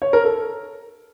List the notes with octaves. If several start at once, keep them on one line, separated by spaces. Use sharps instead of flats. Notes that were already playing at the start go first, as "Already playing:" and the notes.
C#5
A#4
A4